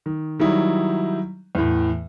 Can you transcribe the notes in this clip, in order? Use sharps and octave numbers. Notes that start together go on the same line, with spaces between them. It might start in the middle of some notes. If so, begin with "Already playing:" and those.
D#3
D#3 F#3 G3 D#4 E4
E2 A2